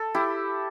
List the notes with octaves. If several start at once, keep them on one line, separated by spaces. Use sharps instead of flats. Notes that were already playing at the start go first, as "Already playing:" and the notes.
Already playing: A4
E4 G4